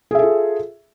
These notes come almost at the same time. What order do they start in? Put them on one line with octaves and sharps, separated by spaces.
G#4 E5 A4 F4